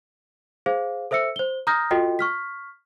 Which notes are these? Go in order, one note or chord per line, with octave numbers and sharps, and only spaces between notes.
G#4 C5 F5
A4 C5 E5 E6 C#7
C5 G7
A#5 D#6 F6 G6 A#6
F4 F#4 A4 D#5 G5
C#6 F6 B6